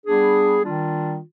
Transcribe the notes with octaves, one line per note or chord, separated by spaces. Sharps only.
G3 B3 D4 G#4
D#3 G3 D4 F4